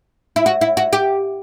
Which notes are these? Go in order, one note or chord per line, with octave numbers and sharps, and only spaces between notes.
E4
F#4
E4
F#4
G4